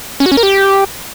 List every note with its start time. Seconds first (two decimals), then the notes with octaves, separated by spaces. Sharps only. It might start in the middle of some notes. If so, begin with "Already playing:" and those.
0.20 C#4
0.26 F#4
0.32 C#4
0.37 A#4
0.43 G4